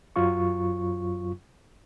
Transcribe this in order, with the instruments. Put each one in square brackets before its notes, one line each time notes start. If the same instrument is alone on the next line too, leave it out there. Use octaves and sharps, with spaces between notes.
[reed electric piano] F#2 F#3 F4 C#6